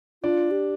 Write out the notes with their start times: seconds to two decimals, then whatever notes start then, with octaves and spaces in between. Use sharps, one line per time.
0.23 D4 F4 D5
0.51 G4